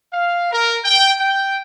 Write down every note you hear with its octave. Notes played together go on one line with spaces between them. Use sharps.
F5
A#4
G5
G5